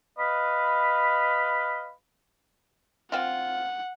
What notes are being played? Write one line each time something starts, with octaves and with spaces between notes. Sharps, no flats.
B4 D#5 F5 B5
C4 F4 F#5